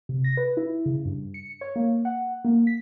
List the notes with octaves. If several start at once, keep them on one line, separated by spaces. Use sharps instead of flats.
C3
A#6
B4
E4
C#3
G2
C#7
C#5
A#3
F#5
A#3
B6